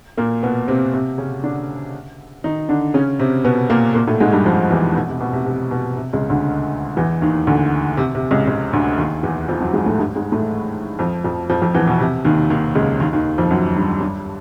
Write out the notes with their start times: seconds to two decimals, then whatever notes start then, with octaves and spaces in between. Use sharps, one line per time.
0.17 A#2 A#3
0.43 B2 B3
0.68 C3 C4
0.93 C3 C4
1.18 C#3 C#4
1.43 D3 D4
2.44 D#3 D#4
2.69 D3 D4
2.94 C#3 C#4
3.19 C3 C4
3.44 B2 B3
3.70 A#2 A#3
3.95 A#2 A#3
4.07 A2 A3
4.20 G#2 G#3
4.32 G2 G3
4.45 F2 F3
4.70 E2 E3
4.95 B2
5.08 C3
5.21 B2
5.33 C3
5.46 C3
5.71 B2
5.96 C3
6.13 C#2 C#3
6.29 D2 D3
6.97 E2 E3
7.21 D#2 D#3
7.47 D2 D3
7.97 C3
8.15 C3
8.31 C#2 C#3
8.47 C#2 C#3
8.73 D2 D3
8.98 D#2 D#3
9.23 E2 E3
9.48 F2 F3
9.61 F#2 F#3
9.73 G#2 G#3
9.86 A2 A3
9.98 G2 G3
10.15 G#2 G#3
10.32 A2 A3
10.99 F2 F3
11.24 F2 F3
11.50 F2 F3
11.62 F2 F3
11.74 E2 E3
11.87 B2
12.00 C3
12.25 D#2 D#3
12.50 D#2 D#3
12.75 C#2 C#3
13.00 D#2 D#3
13.13 D#2 D#3
13.38 F2 F3
13.51 F#2 F#3
13.76 G2 G3
14.00 G2 G3